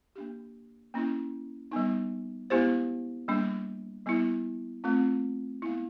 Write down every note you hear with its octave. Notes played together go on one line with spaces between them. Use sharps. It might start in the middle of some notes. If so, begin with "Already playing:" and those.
A#3 D4 G4
A#3 C#4 E4
G3 B3 D#4
G#3 B3 E4 G4 C5
G3 A#3 D4
G3 B3 E4
A3 C4 F4
G#3 B3 E4